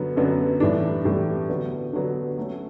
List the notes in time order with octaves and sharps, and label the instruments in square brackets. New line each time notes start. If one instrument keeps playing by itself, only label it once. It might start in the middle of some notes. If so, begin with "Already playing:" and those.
Already playing: [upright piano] F#2 D3 F#3 B3
F#2 D3 F#3 B3
A2 E3 G3 D4
A2 E3 G3 D4
D3 F#3 B3
D3 F#3 B3
F#3 A3 C#4